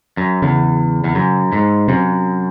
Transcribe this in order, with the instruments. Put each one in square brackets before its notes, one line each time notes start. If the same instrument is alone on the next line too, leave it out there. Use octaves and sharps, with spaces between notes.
[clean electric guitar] F#2
[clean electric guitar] E2 [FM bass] C#3
[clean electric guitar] E2
F#2
G#2
[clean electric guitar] F#2 [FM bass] C3